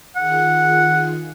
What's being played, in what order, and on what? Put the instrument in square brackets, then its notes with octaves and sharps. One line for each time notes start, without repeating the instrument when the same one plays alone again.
[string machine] D#3 F4 G#4 [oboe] F#5